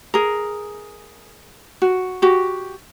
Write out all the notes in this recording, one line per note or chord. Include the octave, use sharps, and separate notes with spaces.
G#4 A#4
F#4
F#4 G4